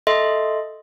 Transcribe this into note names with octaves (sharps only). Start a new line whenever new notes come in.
A4 D#5 E5 C6